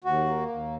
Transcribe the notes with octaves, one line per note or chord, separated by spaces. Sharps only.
D#2 F#4
A#3
D#2